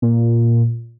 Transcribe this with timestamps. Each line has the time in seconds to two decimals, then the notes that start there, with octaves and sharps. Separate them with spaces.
0.02 A#2